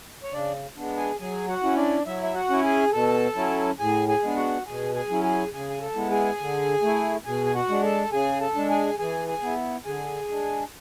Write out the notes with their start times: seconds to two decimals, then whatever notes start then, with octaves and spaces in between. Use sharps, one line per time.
0.23 C#5
0.32 C#3 D4 D5
0.76 G#3 B3 D4
0.97 G#4 G#5
1.19 F#3 G#4 G#5
1.48 F#4 F#5
1.63 C#4 E4
1.77 D4 D5
2.06 F#3 E4 E5
2.23 E5
2.34 F#4 F#5
2.50 C#4 E4
2.64 G#4 G#5
2.92 B2 A4 A5
3.36 F#3 C#4 E4
3.79 A2 G#4 G#5
4.08 G#4 G#5
4.23 G#3 B3 D4
4.37 F#4 F#5
4.66 B2 G#4 G#5
4.94 G#4 G#5
5.09 F#3 C#4 E4
5.23 G#4 G#5
5.52 C#3 G#4 G#5
5.70 G#5
5.81 A4 A5
5.95 G#3 B3 E4
6.11 G#4 G#5
6.40 D3
6.82 A3 E4
7.25 B2 G#4 G#5
7.46 G#5
7.55 F#4 F#5
7.69 G#3 D4
7.83 A4 A5
8.12 C#3 G#4 G#5
8.41 A4 A5
8.55 G#3 D4
8.70 G#4 G#5
8.98 E3 G#4 G#5
9.28 G#4 G#5
9.42 B3 E4
9.85 D3 G#4 G#5
10.29 G#3 D4